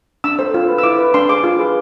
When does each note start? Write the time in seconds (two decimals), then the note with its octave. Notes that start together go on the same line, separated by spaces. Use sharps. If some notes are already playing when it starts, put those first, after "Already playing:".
0.24 D4 E6
0.39 A4 C5
0.54 F4
0.68 B4
0.78 E6
0.83 E4 D6
0.99 B4
1.14 D4 C6
1.29 G#4 C5 D6
1.44 F4
1.59 G#4 B4